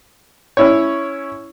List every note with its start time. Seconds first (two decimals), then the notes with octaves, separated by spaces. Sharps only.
0.57 C#4 E4 C#5